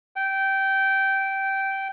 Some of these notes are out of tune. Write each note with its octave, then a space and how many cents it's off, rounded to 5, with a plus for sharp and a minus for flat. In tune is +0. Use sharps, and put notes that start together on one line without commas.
G5 -15